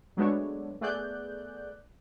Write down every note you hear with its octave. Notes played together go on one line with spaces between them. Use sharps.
F#3 G#3 A3 B3 D4 C#5
A3 B3 G#4 D5 F#6 G6